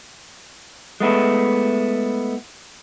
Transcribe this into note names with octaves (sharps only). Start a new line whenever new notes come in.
G#3 A3 B3 E4